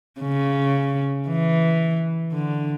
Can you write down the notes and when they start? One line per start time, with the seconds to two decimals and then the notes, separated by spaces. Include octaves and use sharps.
0.21 C#3
1.28 E3
2.33 D3